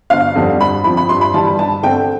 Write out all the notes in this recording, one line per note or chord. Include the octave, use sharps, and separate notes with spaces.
G1 F5
F2 D3 G3 C4
G2 B5
F3 C4 B5
B5
G2 C6
B5
E3 G3 A5
B5
G2 A5
D3 A3 C4 G5